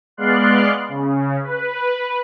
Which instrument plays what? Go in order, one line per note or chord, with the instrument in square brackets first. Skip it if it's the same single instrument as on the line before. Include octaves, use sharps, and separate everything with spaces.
[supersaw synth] G#3 B3 D5 F5 C6 F#6
C#3
B4